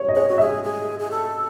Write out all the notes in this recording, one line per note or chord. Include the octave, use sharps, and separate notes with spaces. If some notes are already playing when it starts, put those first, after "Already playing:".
Already playing: C#5
D#5
G#4 C#5
F#4
G#4 E5
D#5
G#4
G#4
A4